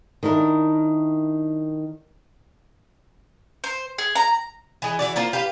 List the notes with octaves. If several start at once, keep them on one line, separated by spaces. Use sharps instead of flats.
D#3 D4 E4 A#4
C5
G#4
A#5
E3 G#3
E3 F#4 D5
A#3 F4 C5
G4 B4 C5 F5